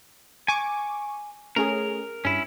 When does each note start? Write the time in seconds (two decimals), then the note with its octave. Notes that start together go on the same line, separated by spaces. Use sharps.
0.48 G#5 C#6 D6
1.56 A3 C#4 G#4 A#4
2.25 G2 C#4 E4